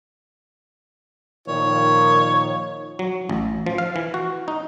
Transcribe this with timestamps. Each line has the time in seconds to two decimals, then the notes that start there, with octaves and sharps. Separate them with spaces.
1.48 A#2 D#3 F3 C#5
2.99 F#3
3.29 A1
3.66 F3
3.78 F5
3.96 E3
4.14 F#4
4.48 D#4